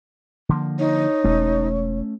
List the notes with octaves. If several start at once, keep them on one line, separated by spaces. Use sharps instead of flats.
D3 F3 A#3
D#4 C#5
E1 A3 C#4